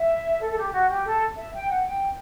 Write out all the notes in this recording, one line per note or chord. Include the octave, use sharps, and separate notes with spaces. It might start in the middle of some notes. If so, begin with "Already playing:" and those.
Already playing: E5
A4
A4
G4
F#4
G4
A4
E5
G5
F#5
G5